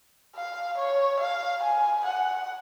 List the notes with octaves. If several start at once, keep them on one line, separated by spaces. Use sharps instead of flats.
F5
C#5
F5
G#5
F#5